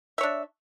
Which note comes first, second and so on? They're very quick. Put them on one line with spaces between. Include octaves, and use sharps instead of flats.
E5 C#5 D4